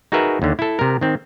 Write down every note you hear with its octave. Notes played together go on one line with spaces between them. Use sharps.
D#4 F#4 G#4 A#4 B4 E5
D#2 D3
E4 A4
C3 A#4
D#3 C4